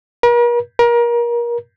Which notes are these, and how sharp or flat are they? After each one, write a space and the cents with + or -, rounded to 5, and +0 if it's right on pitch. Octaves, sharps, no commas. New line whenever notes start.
A#4 +45
A#4 +30